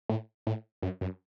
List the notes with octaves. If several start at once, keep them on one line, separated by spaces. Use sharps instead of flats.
A2
A2
F#2
F#2